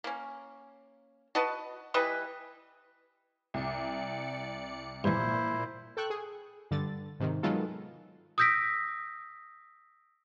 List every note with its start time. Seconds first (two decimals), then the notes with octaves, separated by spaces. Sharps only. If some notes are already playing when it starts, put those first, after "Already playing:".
0.04 A#3 C#4
1.35 F#4 B4 D#5 A5
1.94 E3 G3 B4 D#5
3.54 C2 D5 C#7
5.04 G2 A#2 E3 E4 C5
5.97 A4 G5 C#6 F#6
6.10 G#4
6.71 G2 D3 A6
7.20 G#2 C3 D#3
7.43 D#3 F#3 G#3 B3 F4 A4
8.38 D#6 E6 G6 A#6 B6 D7